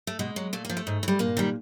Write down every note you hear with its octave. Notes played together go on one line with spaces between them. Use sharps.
A3
B2 G#3
F#3
A#2 A3
F3 A#3
A3
G#2
E3
G3
G2 A#2 A#3
D#3 G3